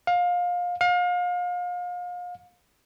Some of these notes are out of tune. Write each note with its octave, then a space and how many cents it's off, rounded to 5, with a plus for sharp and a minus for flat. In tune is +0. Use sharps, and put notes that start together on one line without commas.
F5 +25
F5 +35